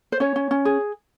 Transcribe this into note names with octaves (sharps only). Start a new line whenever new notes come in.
C5
C#4 C#5
C#4
C#4
G#4